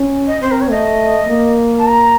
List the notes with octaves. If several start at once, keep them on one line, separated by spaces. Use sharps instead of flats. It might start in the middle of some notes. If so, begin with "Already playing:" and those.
Already playing: C#4
D#5
C4 C5
A#4
C#5
A3 D#5
A#3
A5
A#5